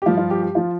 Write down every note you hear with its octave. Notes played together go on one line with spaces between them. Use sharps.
G4
G2 F3 F4
F4
G4
G4
F3 F4